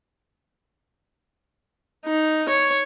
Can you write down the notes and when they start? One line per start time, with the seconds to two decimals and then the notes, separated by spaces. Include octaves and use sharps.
2.06 D#4
2.49 C#5